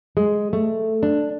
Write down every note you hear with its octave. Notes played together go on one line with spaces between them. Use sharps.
G#3
A3
D4